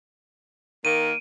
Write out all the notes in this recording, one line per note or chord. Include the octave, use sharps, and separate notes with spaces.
D#3 A#3 D7 D#7